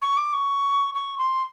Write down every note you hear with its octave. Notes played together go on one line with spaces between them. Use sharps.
C#6
D6
C#6
C#6
C6